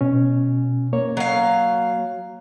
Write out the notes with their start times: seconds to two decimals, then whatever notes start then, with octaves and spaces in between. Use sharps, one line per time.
0.01 B2 C#4
0.93 A#3 C#5
1.17 F#3 F5